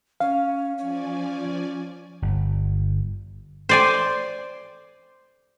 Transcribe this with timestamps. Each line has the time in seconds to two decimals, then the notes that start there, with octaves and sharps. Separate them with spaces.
0.20 C#4 F5
0.78 F3 C#4 D5 G#5
2.22 G1
3.69 C5 D5 G#5